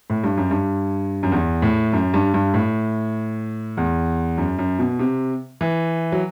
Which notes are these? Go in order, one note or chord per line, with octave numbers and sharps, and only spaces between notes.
A2
G2
F#2
G2
F#2
E2
A2
F#2
G2
G2
A2
E2
F#2
F#2
B2
C3
E3
F#3